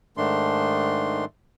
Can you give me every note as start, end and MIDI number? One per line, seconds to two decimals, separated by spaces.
0.17 1.25 44
0.17 1.25 51
0.17 1.25 57
0.17 1.25 62
0.17 1.25 84